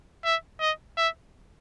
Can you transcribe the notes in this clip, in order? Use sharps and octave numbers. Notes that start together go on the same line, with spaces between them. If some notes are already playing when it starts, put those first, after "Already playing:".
E5
D#5
E5